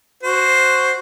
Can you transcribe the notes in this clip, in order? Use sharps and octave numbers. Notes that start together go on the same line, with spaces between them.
F#4 C5